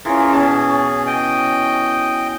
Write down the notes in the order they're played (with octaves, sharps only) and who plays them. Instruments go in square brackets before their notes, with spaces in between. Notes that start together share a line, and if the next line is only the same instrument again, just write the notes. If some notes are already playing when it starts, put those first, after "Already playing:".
[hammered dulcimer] E3 C#4 [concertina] F4 G#4 A#4
[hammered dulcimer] B2 C#4 A5 [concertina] G#4
[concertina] D#5 G5